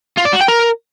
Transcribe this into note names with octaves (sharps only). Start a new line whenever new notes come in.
F4
D5
F#4
G5
A#4